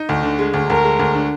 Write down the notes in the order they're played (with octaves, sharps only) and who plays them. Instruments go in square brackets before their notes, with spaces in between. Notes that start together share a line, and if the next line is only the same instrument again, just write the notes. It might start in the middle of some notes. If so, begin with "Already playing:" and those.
Already playing: [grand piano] D#4
D2
D3
G#3
D2
[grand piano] D2 [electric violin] A#4
[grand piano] G#3
D2
D3